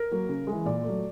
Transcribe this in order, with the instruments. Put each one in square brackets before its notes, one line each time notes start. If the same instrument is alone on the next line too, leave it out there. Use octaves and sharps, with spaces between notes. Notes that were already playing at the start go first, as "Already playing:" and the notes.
Already playing: [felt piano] A#4
F#3 A#3
C#3
G#3
E3
A#2 D5
F#3 A3